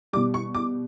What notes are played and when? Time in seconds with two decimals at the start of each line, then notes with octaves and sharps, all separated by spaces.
0.13 G3 D6
0.16 B2
0.34 C#6
0.54 D6